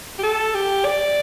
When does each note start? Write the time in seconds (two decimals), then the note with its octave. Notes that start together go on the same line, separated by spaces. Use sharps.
0.18 G4
0.23 A4
0.54 G4
0.85 D5